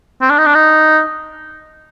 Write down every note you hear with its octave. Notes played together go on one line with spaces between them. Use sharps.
C4
D4
D#4
D4
D#4